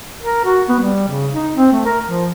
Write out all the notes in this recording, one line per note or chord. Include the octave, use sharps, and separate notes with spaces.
A#4
F#4
B3
G3
C#3
D#4
C4
A3
A#4
F3